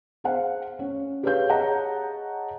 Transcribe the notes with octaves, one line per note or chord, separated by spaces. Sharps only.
G#4 C5 F5 F#5
C#4
G4 G#4 B4 C#5 F5 G6
G#4 C#5 D#5 F#5 A5 A#5